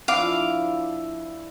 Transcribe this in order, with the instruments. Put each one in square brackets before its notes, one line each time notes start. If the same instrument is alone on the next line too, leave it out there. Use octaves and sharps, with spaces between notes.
[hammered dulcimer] F3 D4 E4 [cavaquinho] F5 D6